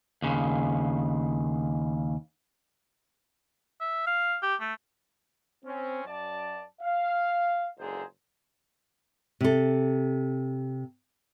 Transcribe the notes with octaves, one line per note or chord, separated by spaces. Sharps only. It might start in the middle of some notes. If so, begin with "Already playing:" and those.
D#2 C#3
E5
F5
G4
A3
C4 C#4
F#2 D5 A5
F5
F#1 C#2 D3 G#4 C5 A#5
C3 A4